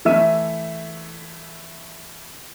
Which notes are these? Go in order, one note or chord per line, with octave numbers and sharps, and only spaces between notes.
E3 A3 E5 E6 D#7